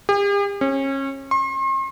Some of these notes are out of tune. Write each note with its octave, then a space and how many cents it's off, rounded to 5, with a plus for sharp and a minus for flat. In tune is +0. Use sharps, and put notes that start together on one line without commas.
G4 +45
C#4 -30
C6 +45